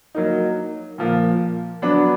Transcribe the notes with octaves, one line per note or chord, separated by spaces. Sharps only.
F#3 A#3 D#4
A#2 F3 A#3
F#3 B3 D4